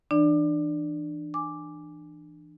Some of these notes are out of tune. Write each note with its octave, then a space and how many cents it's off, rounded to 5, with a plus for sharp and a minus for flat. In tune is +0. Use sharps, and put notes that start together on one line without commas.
E3 +0 D4 +30 D5 -5
G#5 +0 D6 +0